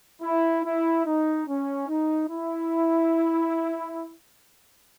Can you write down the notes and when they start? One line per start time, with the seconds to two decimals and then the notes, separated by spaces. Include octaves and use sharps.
0.22 E4
0.63 E4
1.05 D#4
1.46 C#4
1.87 D#4
2.29 E4